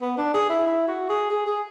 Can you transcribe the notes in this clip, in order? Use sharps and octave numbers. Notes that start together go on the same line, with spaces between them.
B3
D4
G#4
E4
E4
F#4
G#4
G#4
G#4